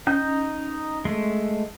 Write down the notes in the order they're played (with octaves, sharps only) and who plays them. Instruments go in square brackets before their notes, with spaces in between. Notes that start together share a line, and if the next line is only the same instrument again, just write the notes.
[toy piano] C#4 [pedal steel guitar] D#4 G6
[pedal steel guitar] G#3 A3